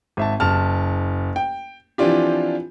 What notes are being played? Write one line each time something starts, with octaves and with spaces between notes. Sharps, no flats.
G#1 E5 A5
F#1 A5 F6
G5
E3 F3 C4 D4 F4 G4